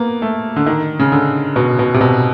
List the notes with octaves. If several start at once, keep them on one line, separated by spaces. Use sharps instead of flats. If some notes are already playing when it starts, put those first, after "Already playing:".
Already playing: A#3 B3
A3
D3
D#3
C#3
D3
B2
B2
C3
B2